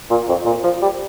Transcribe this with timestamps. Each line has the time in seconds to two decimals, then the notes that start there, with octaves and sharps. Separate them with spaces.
0.10 A#2
0.28 F2
0.46 A#2
0.64 F3
0.82 G3